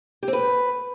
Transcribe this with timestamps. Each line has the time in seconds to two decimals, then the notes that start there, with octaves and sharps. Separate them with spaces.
0.23 G4
0.28 C4
0.33 B4